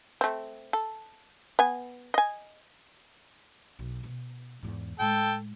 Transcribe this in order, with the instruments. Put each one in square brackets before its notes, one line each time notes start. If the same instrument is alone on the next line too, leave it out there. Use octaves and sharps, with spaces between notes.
[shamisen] A3 C4
A4
B3 G#5
D#5 G#5
[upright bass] B1
B2
E2 G#2
[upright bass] A2 G#3 [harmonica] A4 G5